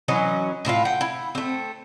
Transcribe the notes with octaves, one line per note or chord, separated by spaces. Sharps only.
E3 F#3 C#4 D#5
A2 E4 F4 F5
F#5 G5
E4
A3 C4